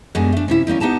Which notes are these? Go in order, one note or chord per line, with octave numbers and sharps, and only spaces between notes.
F#2 B2 G3 G#3 D4 G#5
A3 D4
C3 C#4 E4
D#3 G3 A#3 C#4
B3 D#4 G4 A5 A#5